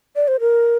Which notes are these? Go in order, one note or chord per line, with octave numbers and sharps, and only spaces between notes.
D5
C5
A#4